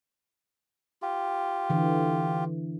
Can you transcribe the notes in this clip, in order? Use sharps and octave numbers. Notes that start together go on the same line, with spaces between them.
F4 G4
D3 E3